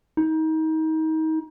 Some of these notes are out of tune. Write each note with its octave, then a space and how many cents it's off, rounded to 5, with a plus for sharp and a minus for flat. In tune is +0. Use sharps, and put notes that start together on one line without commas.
D#4 +30